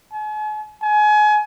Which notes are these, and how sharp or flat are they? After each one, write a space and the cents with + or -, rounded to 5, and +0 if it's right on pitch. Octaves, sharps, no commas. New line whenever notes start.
G#5 +45
G#5 +30